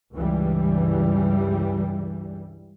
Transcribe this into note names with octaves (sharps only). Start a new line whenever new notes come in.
C#2 G2 E3 G3